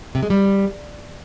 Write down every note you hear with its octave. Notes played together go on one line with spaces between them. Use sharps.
C3
G#3
G3